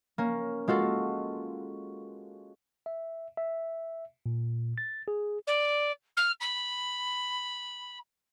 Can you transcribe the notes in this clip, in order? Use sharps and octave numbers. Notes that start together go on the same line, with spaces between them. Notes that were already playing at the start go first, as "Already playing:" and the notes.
A#3 C#4
G#3 F4 F#4 A4
E5
E5
A#2
A6
G#4
D5
F6
B5